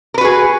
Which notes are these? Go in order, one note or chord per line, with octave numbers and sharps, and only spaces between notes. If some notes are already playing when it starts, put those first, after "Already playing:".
F#4 G#4 A#4 B4